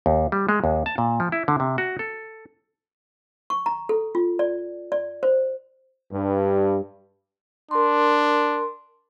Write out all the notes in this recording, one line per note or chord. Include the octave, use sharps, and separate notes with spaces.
D#2
G3
G#3
D#2
A5
A#2
F3
E4
D3
C3
F#4
A4
C#6
A#5
A4
F4
D5
D5
C5
G2
D4 A#4 C6